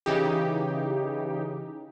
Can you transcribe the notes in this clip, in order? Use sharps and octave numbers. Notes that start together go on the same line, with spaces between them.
C#3 E3 D#4 G4